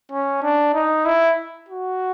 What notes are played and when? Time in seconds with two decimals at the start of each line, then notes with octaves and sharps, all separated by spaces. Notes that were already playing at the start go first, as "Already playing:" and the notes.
0.12 C#4
0.43 D4
0.74 D#4
1.06 E4
1.69 F#4